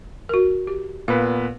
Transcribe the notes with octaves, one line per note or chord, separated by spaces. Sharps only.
F#4 A#4
G4
A#2 B3 B4 F5